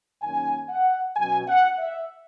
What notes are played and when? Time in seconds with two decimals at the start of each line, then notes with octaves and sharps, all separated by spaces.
0.22 F#2 D#3 A#3 C#4 G#5
0.69 F#5
1.16 B2 F#3 C#4 G#5
1.47 F#5
1.78 E5